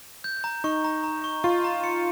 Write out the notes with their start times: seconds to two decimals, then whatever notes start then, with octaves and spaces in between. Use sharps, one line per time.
0.24 G6
0.44 A#5
0.64 D#4 C#6
0.84 A#5
1.04 A#5
1.24 C#6
1.44 F4 C#6
1.64 A#5
1.84 C#7